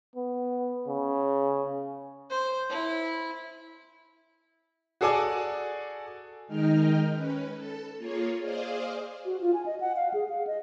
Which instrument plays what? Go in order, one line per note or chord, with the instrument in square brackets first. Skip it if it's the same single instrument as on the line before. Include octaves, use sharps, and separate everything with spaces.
[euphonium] B3
C#3
[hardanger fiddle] C5
E4
[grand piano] F#4 G#4 A4 D5 G#5 D6
[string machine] D#3 G#3 D#4 D#5 G5 F6
C#4 B4
A4 A5
A#3 F4 G#4 C#5
G#4 C5 D5 D#5 F5
[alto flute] F#4
F4
G#5
D#5
F#5
F5
G#4
F5
D#5